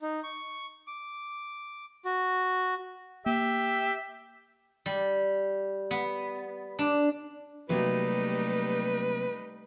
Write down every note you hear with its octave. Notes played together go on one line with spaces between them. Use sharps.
D#4
C#6
D6
F#4
A#3 G4 E5
G3
B3
D4
C3 F#3 G3 A3 A#3 D#4 B4